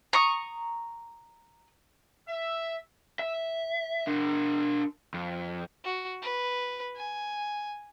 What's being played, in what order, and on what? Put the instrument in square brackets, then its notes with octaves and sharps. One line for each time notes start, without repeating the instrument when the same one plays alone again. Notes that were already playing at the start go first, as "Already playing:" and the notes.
[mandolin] A#5 C#6 D#6
[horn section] E5
[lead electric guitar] E5
D4 A#4
F2
[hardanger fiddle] F#4
B4
G#5